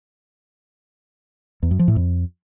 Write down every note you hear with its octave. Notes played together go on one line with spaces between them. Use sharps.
E2
F#2
F3
A2
F2